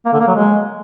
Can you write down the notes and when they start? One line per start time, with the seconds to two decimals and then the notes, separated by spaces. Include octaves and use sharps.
0.05 A#3
0.13 D3
0.20 A#3
0.27 F#3
0.35 G#3